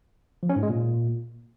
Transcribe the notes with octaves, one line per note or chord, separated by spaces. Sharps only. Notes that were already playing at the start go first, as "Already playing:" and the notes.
F3
C#4
G#2
G#3
A#2